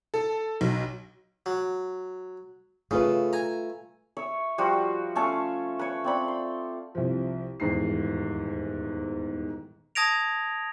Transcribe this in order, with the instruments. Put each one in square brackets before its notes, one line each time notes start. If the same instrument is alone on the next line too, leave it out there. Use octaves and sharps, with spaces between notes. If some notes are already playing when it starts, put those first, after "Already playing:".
[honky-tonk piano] A4
B1
[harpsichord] F#3
[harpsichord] C#3 [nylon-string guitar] A3 F4 B4
[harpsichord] G#5 A#5
[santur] C#5 E5
F3 G3 F4 F#4
A3 C#4 A4 F5
B4 C#5
C4 D5 B5
C6
[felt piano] C2 F3
D#1 E2 G#2 C7
[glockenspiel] A5 D#6 G#6 A#6 D7 F7